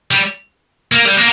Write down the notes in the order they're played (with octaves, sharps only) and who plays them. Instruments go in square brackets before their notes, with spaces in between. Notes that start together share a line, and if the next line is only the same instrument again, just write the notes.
[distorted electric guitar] G3
A#3
G3
A#3